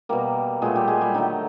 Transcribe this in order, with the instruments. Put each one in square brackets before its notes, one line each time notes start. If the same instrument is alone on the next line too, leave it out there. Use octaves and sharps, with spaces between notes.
[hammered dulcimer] B2 G3 A#3 A#4
A#2 F#3 G#3 A3 G#4
G3 G4
G#3 G#4
G3 G4
D3 D#3 F#3 A3 D#4